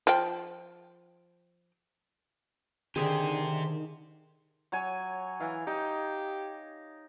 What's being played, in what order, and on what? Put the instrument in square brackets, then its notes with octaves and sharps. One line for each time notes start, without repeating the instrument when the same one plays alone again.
[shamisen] F3 G5
[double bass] D3 [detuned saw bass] D#3 [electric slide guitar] G4 C5 [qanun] G#4
[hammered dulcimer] F#3 C#5 G#5
[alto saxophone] E3 [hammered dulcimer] F5
[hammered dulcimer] D#4 [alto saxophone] G4